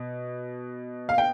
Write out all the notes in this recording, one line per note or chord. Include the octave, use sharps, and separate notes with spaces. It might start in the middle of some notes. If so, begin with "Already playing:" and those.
Already playing: B2
F5
G5